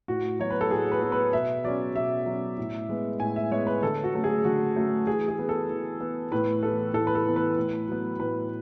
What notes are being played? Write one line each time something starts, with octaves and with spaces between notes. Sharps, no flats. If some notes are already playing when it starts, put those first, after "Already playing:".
A2 F#4
F#3 B3 C#5
B4
A4
A2 G#4
B4
F#3 B3
B4
B2 E5
F#3 C#4 D5
B2 E5
F#3 C#4
A2
G#3 B3
A2 G#5
E5
G#3 B3 C#5
B4
D3 A4
F#4
F#3 A3 C#4
G#4
D3 F#4
F#3 A3 C#4
E3 G#4
G#4
B3
A4
E3
B3
A2 B4
E3 B3 A4
A2 A4
B4
A4
E3 B3
B4
A2
F#3 B3
A2 B4